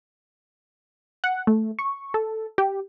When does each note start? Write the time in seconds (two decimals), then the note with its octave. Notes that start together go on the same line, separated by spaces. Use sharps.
1.24 F#5
1.47 A3
1.79 C#6
2.14 A4
2.58 G4